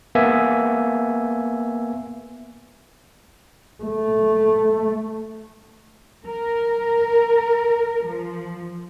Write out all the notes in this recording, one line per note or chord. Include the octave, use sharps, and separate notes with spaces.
A#3 B3 E5 G#5
A3
A#4
F3